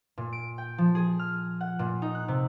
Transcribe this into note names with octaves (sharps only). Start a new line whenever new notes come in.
A#2
D7
G5
F3
G#4
F6
F#5
A#2
D#4
F#6
C3